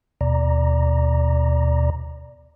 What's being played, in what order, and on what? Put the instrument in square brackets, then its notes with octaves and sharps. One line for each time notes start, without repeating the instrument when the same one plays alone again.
[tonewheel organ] D#2 B2 D5 A#5